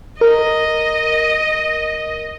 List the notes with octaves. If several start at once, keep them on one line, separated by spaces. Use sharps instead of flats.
A#4 D#5